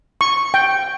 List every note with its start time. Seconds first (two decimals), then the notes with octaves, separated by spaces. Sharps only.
0.21 C#6
0.54 G5